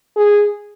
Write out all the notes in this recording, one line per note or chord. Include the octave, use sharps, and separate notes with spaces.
G#4